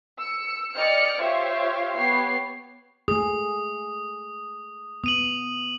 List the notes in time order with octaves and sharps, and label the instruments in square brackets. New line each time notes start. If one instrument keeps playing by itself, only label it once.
[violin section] E6 C#7
D5 D#5 G5 F6 C#7
F4 G4 C5 C#5 E5 F5
B3 G4 C#5 C7
[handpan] A3 G#4 [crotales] D#6
[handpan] B3 [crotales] D#6 D#7 F#7